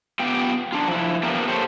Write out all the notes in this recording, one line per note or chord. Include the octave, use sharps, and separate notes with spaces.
B3 F4 G4 G5
D4 F4
F3 E4
A#3 B3 D4 F4 G4 A#4
G4 A4 C5 C#5